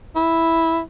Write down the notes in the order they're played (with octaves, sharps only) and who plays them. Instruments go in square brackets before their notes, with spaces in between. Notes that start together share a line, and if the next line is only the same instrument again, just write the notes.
[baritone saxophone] E4